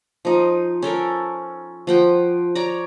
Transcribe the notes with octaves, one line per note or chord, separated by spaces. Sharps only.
F3 D#4
C#4 A4 A#4
F3 F#5 G5
C#5 D5 A#5